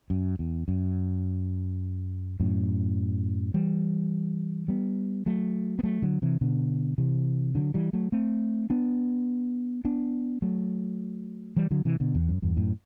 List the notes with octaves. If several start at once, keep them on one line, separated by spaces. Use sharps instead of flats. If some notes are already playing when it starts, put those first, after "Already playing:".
F#2
E2
F#2
F#2 A2
E3 G3
G3 B3
F#3 A3
B3
F#3 A3
D3 F#3
C3 E3
B2 D3
C3 E3
D3 F#3
E3 G3
F#3 A3
A3 C4
B3 D4
B3 D4
F#3 A3
E3 G3
D3 F#3
C3 E3
B2 D3
E2
F#2
E2 G2
F#2 A2